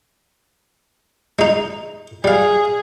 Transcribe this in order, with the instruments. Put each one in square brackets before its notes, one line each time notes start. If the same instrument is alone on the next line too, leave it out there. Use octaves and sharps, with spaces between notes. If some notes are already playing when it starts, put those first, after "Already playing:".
[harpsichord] G#3 D#4
[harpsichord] G3 F5 [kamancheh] G#4